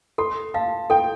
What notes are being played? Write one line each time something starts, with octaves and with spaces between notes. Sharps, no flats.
A4 C6
F5 A5
A4 G5